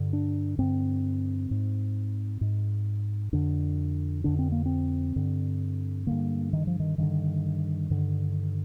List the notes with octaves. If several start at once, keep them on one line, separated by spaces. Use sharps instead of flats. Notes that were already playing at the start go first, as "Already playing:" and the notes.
Already playing: G2 D3
D4
G2 D3 C4
G#2
G#2
F2 D3 D4
F2 D3 D4
C4
A#3
C4
G2 D3
G2 D3 A#3
D#3
F3
D#3
G2 D3 D#3
G2 D3